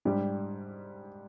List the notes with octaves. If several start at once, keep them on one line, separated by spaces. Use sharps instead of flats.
G#2 G3 D4 G4